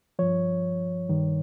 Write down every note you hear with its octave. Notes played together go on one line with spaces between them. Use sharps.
G2 F3 C#5
G2 D#3